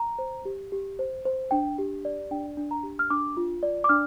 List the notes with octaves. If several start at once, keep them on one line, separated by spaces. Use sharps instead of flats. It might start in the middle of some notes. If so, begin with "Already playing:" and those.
Already playing: A#5
C5
G4
G4
C5
C5
D4 G5
G4
D5
D4 G5
D4
A#5
G4
F6
D4 D6
F4
D5
D6
D4 F6